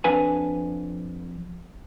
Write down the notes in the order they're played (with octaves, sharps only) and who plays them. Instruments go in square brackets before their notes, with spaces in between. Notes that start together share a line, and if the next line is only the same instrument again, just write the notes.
[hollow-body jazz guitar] F2 D4 B4 F5 G#5